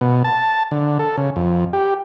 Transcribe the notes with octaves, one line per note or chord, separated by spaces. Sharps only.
B2
A5
D3
A4
C#3
F2
G4